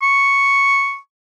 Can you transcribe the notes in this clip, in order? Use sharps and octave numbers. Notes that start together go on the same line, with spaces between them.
C#6